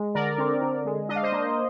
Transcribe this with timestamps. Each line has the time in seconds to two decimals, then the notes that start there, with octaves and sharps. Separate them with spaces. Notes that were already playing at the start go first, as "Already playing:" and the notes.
Already playing: G#3
0.15 D3 A#4 D5
0.38 C4
0.62 D3
0.85 G#3
1.09 D4 D#5
1.16 F5
1.23 C5 D#5
1.32 A#3